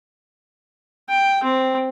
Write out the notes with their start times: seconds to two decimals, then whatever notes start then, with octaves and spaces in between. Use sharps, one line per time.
1.09 G5
1.43 C4